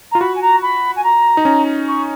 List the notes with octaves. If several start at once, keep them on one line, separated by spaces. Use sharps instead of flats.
F4 A#5
F#4 B5
G#5
A#5
B5
G#5
A#5
D#4
C#4
C#6